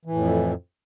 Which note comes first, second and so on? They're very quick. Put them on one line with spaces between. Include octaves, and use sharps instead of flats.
E3 A2 F2